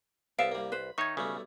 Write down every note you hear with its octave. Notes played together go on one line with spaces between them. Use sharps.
C2 B3 E5 F5 A5 D7
G3 A#3
B4 C5 B5
D#3 D#4 C#5 E5 C#6 G#6
B1 C#3 G3 A3